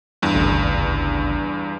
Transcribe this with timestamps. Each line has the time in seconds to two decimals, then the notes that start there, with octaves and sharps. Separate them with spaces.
0.22 E2 G2
0.34 G#1 D2 C#3